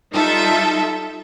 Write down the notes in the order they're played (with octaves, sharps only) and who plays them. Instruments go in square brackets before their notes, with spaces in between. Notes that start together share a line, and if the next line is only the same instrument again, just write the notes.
[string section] G3 D#4 F4 A4 E5